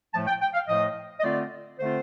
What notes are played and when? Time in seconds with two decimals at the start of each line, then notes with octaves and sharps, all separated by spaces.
0.13 A2 F3 A3 A5
0.27 G5
0.42 G5
0.54 F5
0.68 A2 F3 A3 D#5
1.19 D#5
1.24 D3 A3 C4 F4 D5
1.79 D3 A3 C4 F4 C5